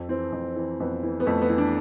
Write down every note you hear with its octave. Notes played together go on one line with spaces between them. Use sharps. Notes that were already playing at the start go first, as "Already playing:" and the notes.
Already playing: F2
E3 C4
F2
E3
F2 B3
E3
B3
F2 A3
B3
E3
D4